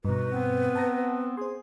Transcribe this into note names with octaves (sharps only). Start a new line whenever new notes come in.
G2 B2 D#4 F#4 B4
B3 C4
A5 A#5 A#6
G#4 C5 C6